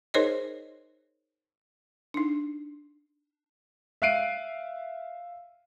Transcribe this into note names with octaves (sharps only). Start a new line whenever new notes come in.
D#4 G#4 A#4 C5 C#5 D#5
D4 D#4
E5 F5 F#6 C7 D7 D#7